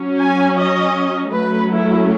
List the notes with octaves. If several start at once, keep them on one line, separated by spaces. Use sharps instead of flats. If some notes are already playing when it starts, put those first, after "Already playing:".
Already playing: F#3 C#4
G#5
D#5
F#3 A3 C#4 B4
E4